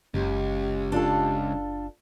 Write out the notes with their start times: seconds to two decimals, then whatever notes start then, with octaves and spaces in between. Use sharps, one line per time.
0.14 F#1 C#2 G4
0.92 D4 F4 A4